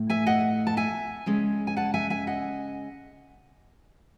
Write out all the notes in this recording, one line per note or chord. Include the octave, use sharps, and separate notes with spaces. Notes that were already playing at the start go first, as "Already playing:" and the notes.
Already playing: A2 A3
E5 G#5
D#5 F#5
A5
E5 G#5
C#3 G#3 C#4
G#5
F#5 A5
E5 G#5
E5 G#5
D#5 F#5